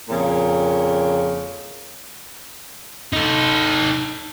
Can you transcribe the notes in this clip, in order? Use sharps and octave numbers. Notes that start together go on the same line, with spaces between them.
F2 A#2 C#3
D#4 A4